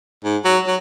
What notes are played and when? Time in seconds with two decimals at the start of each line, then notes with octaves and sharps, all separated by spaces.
0.24 G#2
0.45 F#3
0.67 F#3